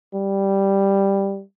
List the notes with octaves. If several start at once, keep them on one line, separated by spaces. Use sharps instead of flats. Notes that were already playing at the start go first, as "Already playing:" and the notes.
G3